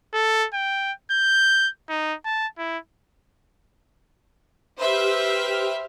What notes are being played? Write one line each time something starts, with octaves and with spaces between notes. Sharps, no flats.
A4
G5
G6
D#4
A5
E4
G4 B4 C5 E5 F6